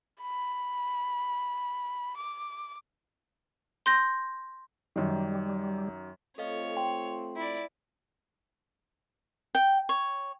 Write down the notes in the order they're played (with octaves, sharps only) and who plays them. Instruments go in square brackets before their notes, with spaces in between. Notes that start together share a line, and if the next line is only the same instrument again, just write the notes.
[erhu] B5
D6
[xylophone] C6 G6 A#6
[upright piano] F#2 D#3 [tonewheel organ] G3
[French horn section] A3 C4 F4 [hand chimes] A4 D#5 F5 [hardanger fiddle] C#5
[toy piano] G5 [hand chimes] C6
[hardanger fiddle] E4 D5
[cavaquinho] G5
C#5